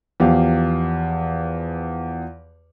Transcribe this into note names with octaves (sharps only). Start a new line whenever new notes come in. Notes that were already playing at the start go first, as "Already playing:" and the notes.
E2 F3 G4 F5